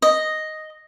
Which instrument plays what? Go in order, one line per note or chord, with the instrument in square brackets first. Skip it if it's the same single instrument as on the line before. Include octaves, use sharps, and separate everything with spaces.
[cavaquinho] D#5